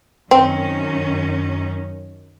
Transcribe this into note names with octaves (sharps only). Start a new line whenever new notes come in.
F#2 D#3 C4 C#4